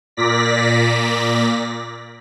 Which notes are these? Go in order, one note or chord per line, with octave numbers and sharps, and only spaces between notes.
A#2 D5 A#6 B6